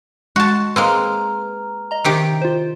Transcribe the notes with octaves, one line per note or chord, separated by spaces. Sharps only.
G#3 F#4 A5
G#3 A#3 C4 B4 A#5 F6
D#5 A#5
C3 D#3 G4
F4 C5